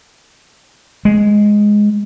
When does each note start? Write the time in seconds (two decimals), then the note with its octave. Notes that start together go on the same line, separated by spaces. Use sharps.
1.05 G#3